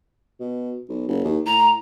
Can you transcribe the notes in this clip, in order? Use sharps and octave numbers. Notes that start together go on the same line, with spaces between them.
B2
B1
F#1
D#2
A2 A#5